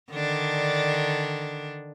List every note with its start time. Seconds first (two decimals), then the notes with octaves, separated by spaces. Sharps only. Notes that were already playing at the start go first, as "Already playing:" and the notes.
0.11 D3 D#3 D4